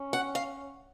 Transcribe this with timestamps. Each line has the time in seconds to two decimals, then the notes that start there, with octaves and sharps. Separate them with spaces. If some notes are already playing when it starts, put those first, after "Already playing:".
Already playing: C#4
0.13 F#5
0.35 F5